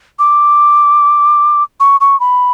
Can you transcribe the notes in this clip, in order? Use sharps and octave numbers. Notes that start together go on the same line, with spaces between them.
D6
C#6
C#6
B5